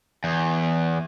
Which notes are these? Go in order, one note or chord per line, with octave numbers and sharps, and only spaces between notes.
E2